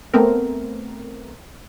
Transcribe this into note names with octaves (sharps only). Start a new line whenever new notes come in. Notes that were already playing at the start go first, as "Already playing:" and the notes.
A3 B3 C4 A#4